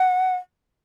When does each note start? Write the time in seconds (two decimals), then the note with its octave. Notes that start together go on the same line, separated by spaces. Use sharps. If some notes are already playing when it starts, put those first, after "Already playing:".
Already playing: F#5